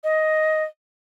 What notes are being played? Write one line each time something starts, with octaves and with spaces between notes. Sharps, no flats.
D#5